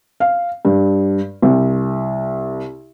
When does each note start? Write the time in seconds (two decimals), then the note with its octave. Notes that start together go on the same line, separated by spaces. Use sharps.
0.20 F5
0.65 G2
1.42 C2